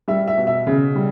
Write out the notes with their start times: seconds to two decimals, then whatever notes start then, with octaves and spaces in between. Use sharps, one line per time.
0.08 G3 E5
0.27 E5
0.37 B2
0.47 E5
0.67 C#3
0.95 G3